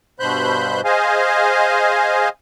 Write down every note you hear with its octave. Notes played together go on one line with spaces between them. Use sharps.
G2 B2 C5 B5 F#6 G6
G#4 C5 D#5 F5 G#5